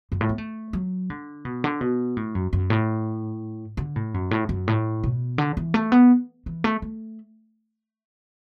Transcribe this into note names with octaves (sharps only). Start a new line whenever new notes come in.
F#2
A2
B3
A3
F#3
D3
B2
D3
B2
A2
F#2
F#2
A2
D3
A2
F#2
A2
F#2
A2
B2
D3
E3
A3
B3
E3
A3
A3